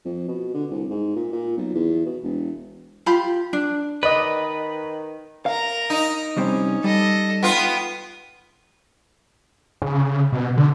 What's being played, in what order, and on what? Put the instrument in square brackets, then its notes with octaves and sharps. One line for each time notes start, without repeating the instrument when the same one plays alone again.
[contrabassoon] F2
B2
D3
C2
G#2
A#2
A#2
B1
E2
B2
E1
[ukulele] F4 G4 B5
D4
[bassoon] D#3 [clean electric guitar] B4 [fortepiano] D5 D#5
[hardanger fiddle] A#4 A#5 [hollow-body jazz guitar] F5
[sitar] D#4
[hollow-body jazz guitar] C2 G3 C4 [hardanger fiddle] C#4
[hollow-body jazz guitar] G3 [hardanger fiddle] A4 D#5
[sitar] B3 F4 [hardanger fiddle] G5
[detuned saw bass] C#3
B2
D3